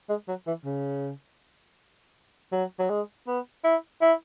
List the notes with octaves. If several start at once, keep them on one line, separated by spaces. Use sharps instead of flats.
G#3
F#3
E3
C#3
F#3
F#3
G#3
B3
E4
E4